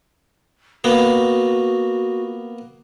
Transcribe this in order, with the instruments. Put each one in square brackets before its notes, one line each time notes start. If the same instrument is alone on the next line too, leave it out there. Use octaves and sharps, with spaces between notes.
[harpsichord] A#3 B3 [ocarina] F#4